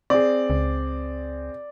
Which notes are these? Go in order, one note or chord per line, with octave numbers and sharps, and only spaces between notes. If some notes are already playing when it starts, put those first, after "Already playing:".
C4 G#4 D5
C#2